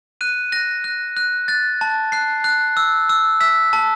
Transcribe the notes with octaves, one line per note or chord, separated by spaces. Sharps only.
F#6 D#7
F#6 A#6
F#6
F#6
F#6 A6
A5
F#6 C7
F#6
E6
E6
E6 B6
A5